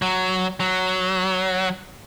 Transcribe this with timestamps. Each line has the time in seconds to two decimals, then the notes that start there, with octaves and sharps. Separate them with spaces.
0.02 F#3
0.60 F#3